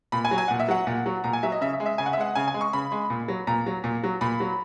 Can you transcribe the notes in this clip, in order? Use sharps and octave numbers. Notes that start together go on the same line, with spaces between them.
A#2 B5
G#5
F#3
G#5
A#2 F#5
E5
F#3 F#5
A#2
F#3
A#2 A#5
G#5
F#3 E5
D#5
C#3 E5
E5
G#3
E5
C#3 G#5
F#5
E5
G#3 F#5
C#3 G#5
G#5
G#3
C#6
C#3 B5
G#3
A#2
F#3
A#2 A#5
F#3
A#2
F#3
A#2 B5
F#3